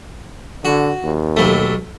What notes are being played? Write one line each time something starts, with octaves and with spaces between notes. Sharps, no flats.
D3 F#4
D#2
B1 G3 A3